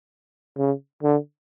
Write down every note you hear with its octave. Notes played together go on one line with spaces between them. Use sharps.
C#3
D3